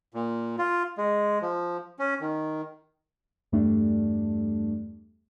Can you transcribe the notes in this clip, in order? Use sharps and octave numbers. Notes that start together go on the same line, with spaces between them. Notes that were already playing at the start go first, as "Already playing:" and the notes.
A#2
F4
G#3
F3
C#4
D#3
E2 G2 G3 A3 D4